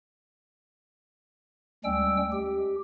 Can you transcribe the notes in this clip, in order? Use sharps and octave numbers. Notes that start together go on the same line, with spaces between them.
D2 G3 G#3 C#4 G5 E6
G4